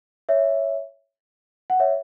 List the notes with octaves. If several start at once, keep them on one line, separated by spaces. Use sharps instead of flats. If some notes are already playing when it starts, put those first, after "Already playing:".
C#5 E5
F#5
C#5 E5